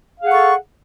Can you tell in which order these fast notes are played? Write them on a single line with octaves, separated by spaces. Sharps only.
F5 G#4 F#5 A4 C#6